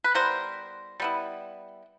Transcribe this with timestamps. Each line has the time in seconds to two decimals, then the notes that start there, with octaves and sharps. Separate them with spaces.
0.04 B4
0.14 G3 B3 E4 A#4 C5
1.00 G3 B3 E4